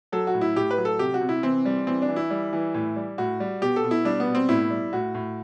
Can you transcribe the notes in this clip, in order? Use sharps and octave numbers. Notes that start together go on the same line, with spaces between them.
F#3 A4
F#4
A2
E4
A2 G4
B4
F#3
A4
C3 G4
F#4
C3
E4
E3 C4
G3
E3 C4
D4
E3
E4
G3
E3
A2
G3
A2 F#4
G3
B2 G4
A4
B2
E4
G3 D4
B3
B2
C4
A2 E4
G3
A2 F#4
A2